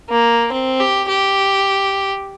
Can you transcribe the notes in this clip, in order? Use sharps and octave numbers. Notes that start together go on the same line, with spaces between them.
A#3
C4
G4
G4